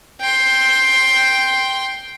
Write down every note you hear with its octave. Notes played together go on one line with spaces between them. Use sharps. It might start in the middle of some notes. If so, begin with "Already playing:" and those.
G5 C6